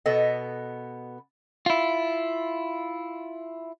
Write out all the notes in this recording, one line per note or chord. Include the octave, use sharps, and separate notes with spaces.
B2 B3 A4 D#5
E4 F4